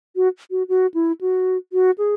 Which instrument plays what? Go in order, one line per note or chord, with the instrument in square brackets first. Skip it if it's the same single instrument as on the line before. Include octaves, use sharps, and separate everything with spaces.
[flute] F#4
F#4
F#4
E4
F#4
F#4
G#4